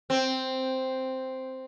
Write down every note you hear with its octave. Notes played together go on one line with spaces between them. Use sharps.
C4